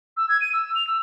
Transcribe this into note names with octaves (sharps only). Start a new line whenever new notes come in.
E6
G#6
D#7
E6
F7
E6